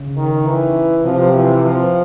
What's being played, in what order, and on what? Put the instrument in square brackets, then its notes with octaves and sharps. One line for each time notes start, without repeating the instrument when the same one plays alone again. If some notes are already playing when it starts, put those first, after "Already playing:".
Already playing: [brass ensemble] C#3
[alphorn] D#3
E3
[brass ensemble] C3 [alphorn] F3
[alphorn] E3
F3